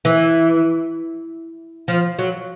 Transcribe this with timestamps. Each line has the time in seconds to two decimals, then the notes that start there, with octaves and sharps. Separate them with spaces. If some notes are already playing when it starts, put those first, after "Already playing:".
0.05 E3
1.88 F3
2.19 F#3